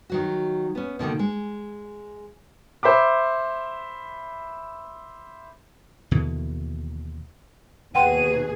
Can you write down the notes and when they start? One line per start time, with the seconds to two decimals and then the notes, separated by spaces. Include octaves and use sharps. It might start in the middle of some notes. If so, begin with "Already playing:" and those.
0.10 D#3 F#3 F#4
0.75 B3 C#4
0.99 B2 D3 D#3 A#3
1.19 G#3
2.83 C5 E5 B5 D6
6.11 D#2 B2 D3 E3
7.95 D#2 B2 G#4 B4 F#5 G5 C6 D#7